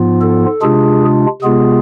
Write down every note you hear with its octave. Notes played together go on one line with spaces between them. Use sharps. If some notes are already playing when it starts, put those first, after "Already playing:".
Already playing: G#2 F3 B3 F4
A4
C3 G#3 D4 F4 G#4
C3 G#3 B3 F4 G#4